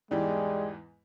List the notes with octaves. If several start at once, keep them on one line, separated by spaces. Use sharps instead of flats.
E2 G#2 E3 G3 G#3